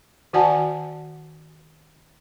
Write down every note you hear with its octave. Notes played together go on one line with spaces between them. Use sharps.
D#3 F#4 D5 F#5 G#5 A5